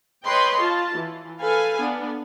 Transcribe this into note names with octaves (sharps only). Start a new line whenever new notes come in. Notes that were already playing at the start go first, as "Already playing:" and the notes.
B4 C#5 D#5 G5 C6
F4 A5
E3
A4 B4 F5 G#5
B3 D4